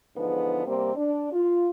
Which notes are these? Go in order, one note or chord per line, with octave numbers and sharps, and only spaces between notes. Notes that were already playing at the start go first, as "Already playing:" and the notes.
E2 G#2 D3 F3 B3
C3 G3 A#3 C4
D4
F4